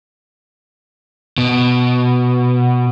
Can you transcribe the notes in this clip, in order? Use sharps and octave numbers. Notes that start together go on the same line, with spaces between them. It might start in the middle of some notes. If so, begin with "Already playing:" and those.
B2